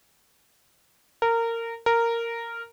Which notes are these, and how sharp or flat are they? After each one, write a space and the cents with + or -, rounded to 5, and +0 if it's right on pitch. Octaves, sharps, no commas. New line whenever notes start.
A#4 -20
A#4 -10